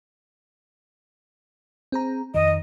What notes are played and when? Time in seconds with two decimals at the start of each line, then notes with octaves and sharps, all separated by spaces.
1.92 C4 G#4 A#5
2.34 F2 D#3 D#5